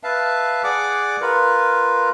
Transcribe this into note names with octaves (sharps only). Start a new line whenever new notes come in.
B4 E5 F5 A5
G#4 D5 F#5 D6
F4 A#4 B4